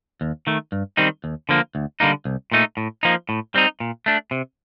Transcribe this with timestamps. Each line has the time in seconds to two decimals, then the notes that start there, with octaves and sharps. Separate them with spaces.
0.21 D#2
0.47 D#3 A3
0.72 G2
0.97 D#3 G3 C4 D#4
1.24 D#2
1.49 D3 F3 A#3
1.75 D2
2.00 D3 G3 A#3 D#4
2.25 C2
2.52 A#2 A3 D#4
2.77 A2
3.03 F3 A#3 D#4
3.29 A2
3.55 G3 C4 D#4
3.80 A#2
4.06 A3 D4
4.31 C3